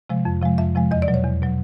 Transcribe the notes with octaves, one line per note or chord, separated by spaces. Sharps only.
C3 F3 G#3
F2
C3 F3 G#3
F2 E5
C3 F3 G#3
E2 D#5
D5
B2 F#3
C#5
E2
B2 F#3